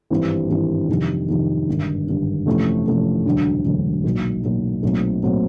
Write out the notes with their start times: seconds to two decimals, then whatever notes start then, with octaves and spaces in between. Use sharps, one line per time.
0.10 G#1 G2 E3 G3 C4
0.50 G#1 G2 E3 G3 C4
0.88 F2 C3 D#3 G3
1.29 F2 C3 D#3 G3
1.68 G#1 G2 D3
2.07 G#1 G2 D3
2.46 F2 C3 E3 A3 C#4
2.86 F2 C3 E3 A3 C#4
3.26 E1 D2 D3 F#3
3.65 E1 D2 D3 F#3
4.04 B1 A#2 F#3
4.44 B1 A#2 F#3
4.83 B1 A#2 F#3 A3 C4
5.23 A#2 F#3 A3 C4